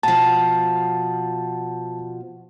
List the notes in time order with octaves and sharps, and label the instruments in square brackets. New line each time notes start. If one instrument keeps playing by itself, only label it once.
[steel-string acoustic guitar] B2 F3 [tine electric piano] A5